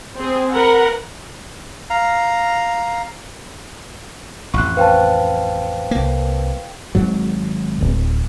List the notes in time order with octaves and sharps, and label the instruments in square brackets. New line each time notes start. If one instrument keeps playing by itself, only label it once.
[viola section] C4 G#4
A#4 B4 F#5
[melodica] F5 A#5
[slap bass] A1 F2 [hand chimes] C#6 F#6
[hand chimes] B4 C5 A5 [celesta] F5 G5
[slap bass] C2 A#3
[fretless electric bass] G#1 G#2 F#3
D1